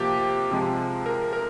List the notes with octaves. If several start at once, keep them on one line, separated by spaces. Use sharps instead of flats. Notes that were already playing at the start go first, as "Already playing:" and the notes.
Already playing: C3 F3 A#3 G4
C3 F3 G#3
A#4
A#4